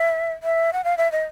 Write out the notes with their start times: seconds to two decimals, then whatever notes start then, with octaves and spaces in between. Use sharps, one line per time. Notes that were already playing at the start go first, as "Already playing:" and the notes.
Already playing: E5
0.43 E5
0.73 F#5
0.84 F5
0.98 E5
1.12 D#5